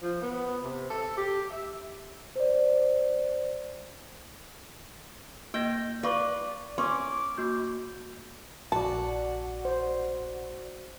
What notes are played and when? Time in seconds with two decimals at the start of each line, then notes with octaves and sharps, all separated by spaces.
0.01 F3
0.22 B3
0.63 C3
0.90 A4
1.17 G4
1.50 E5
2.36 C5 D5
5.54 A#3 D#5 G5 A#6
6.03 B4 D5 F5 C#6 D6
6.78 C#4 C6 D6
7.38 A#3 F#4 G6
8.72 A#1 F#4 D5 A5
9.65 C5